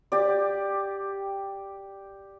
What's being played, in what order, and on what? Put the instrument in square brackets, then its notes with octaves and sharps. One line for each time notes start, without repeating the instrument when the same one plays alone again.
[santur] G4 D5